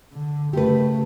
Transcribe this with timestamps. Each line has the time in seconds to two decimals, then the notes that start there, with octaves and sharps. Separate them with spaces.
0.13 D3
0.53 C#3 A3 G4 B4